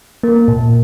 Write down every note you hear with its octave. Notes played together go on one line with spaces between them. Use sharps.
A#3
A#2